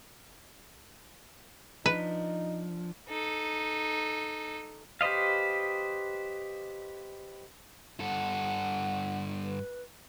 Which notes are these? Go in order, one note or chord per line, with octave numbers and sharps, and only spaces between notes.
F3 D4 D#4 B4
D#4 A4
G4 B4 C5 D#5 F5
G2 A4 F#5
B4